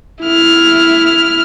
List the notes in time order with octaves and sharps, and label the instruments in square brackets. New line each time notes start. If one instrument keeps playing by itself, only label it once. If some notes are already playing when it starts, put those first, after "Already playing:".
[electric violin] E4 F6